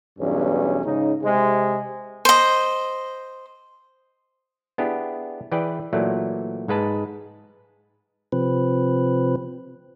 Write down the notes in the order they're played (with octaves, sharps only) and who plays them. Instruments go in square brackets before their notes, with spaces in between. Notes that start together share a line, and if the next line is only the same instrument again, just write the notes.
[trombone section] B1 E2 G2 C#4
G#2 C#3 D#4
C3 G#3
[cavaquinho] C5 D#5
[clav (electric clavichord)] B3 D4 E4 G4 G#4
E3 G#4 B4 D5 G5
A#2 E3 F#3 A3 D5
G#2 G#3 B4 A5
[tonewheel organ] C3 F3 C4 B4